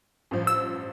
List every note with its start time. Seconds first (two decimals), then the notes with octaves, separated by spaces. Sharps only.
0.31 A1 G2 F3
0.47 E6